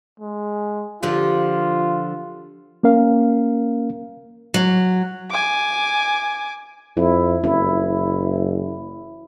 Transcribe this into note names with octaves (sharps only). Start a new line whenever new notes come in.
G#3
D3 F3 F4 G4
A#3 C#4 A#4 F5
F#3
G#5 D6
F2 E4
F#1 E4